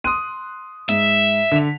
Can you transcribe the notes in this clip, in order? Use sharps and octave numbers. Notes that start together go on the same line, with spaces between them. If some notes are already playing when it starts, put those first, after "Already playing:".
C6 D#6 F#6 D#7
G#2 E5
D3 B6 F7